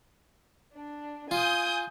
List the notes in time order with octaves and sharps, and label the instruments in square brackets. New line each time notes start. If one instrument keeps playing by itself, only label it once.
[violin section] D4
[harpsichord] F4 [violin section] G#5 D#6 G6